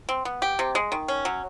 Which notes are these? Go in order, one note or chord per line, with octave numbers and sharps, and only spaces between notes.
C4
B3
G4
C3
G#3
D#3
C#4
F#3